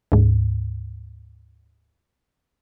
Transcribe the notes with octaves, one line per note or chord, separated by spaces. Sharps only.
D2 G#2